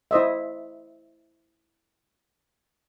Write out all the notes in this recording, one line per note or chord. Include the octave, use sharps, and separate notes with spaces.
E4 C5 D#5 E5